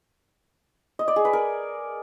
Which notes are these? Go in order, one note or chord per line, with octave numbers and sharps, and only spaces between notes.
D#5
D5
G#4
B4
A#4